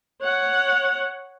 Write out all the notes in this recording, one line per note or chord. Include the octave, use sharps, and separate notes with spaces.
C#5 F#5